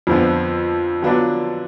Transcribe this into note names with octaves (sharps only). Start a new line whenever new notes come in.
F2 D3 F3 B3 F4
D3 F#3 B3 D4 F4